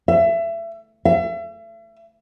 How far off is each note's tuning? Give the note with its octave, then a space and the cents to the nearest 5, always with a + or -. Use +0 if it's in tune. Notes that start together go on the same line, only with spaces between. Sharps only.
E5 +25
E5 +35